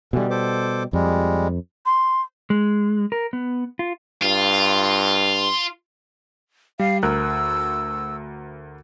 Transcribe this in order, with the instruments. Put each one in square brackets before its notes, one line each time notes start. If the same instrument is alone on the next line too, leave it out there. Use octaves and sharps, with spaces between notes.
[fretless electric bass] B2 G3 [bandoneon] D3 E3
[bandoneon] A4 C5 D6
[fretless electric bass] F2 [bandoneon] G3 G#3
[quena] C6
[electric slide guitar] G#3
A#4
B3
F4
[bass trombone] G2 [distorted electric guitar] F4
[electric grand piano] G3 [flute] F5
[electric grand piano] D2 A#4 F#6 [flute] E6